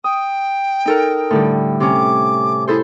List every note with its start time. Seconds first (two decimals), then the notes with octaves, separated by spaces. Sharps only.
0.04 G5 D#6
0.86 D#4 A4 A#4
1.31 A2 D3 G3
1.80 C3 C#4 D6
2.67 E4 G#4 A4 C5